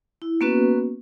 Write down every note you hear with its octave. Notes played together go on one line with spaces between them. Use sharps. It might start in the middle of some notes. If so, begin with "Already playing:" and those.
E4
A#3 B3 C#4 F#4 B4